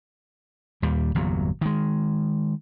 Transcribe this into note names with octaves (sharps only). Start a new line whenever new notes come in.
D#2 A#2 G3
G1 E2 A#2 F#3
D#3 G#3